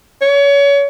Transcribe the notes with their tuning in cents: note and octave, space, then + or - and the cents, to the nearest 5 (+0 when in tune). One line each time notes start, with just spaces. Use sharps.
C#5 +30